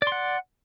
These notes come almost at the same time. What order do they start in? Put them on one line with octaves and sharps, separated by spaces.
D5 C6 F#5